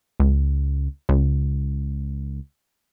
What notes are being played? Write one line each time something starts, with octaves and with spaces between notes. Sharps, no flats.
C#2
C#2